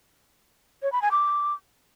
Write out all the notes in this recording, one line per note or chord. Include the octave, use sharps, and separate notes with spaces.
C#5
B5
G#5
D6